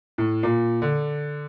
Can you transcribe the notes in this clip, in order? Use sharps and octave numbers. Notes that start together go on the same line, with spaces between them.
A2
A#2
D3